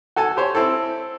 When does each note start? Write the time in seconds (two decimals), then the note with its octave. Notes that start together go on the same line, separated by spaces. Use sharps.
0.16 F#4 A4 G#5 A5
0.37 G4 C5 C#5
0.55 C4 E4 A4